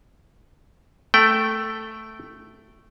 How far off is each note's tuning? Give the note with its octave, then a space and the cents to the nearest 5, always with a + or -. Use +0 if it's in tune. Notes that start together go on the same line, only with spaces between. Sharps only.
A3 +0 G5 -15